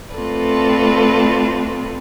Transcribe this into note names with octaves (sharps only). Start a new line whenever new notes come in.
A3 C4 F4 A4 B4 D5